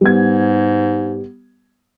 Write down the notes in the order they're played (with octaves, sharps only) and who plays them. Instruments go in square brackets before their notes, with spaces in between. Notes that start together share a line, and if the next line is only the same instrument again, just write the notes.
[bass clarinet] G#2 [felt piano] G3 B3 G#6